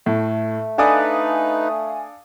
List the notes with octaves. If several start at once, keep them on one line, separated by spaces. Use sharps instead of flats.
A2 A3
D4 D#4 A4 B4 D5 F5 G#5 D#6